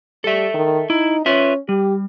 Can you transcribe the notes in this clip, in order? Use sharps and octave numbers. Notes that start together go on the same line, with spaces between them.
G3 A4 E5
D#3
D#4 E4
C#4 F4 B4 E5
G3 G4